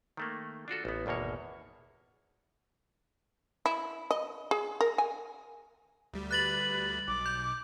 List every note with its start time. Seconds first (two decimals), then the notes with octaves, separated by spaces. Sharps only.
0.17 D#3 A3 A#3
0.68 D4 F4 F#4 A4
0.85 A1 B3
1.06 G#1 E2 B2 A#3 C#5
3.66 E4
4.11 D#5
4.51 G#4
4.81 A#4
4.98 G#5
6.13 D2 G3
6.31 B4 F#6 A6 F#7
7.08 B1 D6
7.26 G6